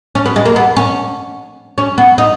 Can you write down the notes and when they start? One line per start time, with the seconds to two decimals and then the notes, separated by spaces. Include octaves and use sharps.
0.15 C#4
0.26 B3
0.36 G#3
0.46 A#3
0.56 B3
0.77 C#4
1.78 C#4
1.98 B3
2.18 D#4